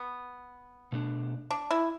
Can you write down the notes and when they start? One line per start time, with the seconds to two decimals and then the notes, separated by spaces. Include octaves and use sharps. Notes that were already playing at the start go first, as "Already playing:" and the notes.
Already playing: B3
0.92 B2 A3 D4
1.51 D4
1.71 E4